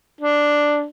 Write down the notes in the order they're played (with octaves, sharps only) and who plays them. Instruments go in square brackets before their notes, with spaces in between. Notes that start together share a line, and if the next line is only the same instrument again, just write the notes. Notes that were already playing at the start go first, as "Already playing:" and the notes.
[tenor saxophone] D4